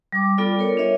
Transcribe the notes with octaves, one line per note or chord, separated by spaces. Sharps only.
G3 D6
G3 B3 F4 A4 D5
A#4 C#5
D4 A#4 C#5 D#5 E5